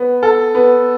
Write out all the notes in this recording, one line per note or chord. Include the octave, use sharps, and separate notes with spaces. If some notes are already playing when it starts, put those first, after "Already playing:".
Already playing: B3
A4
B3